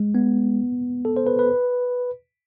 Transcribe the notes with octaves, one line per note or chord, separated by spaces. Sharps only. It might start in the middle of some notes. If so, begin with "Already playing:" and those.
Already playing: G#3
B3
A4
C5
B4
B4